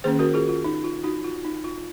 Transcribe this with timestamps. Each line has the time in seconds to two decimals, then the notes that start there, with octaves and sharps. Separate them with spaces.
0.04 D#3 A#3 C#4 G#4 C5
0.19 F#4 A#4
0.34 F4 G#4
0.49 F4
0.64 D#4
0.84 F4
1.04 D#4 F#4
1.24 F4
1.45 D#4
1.64 F4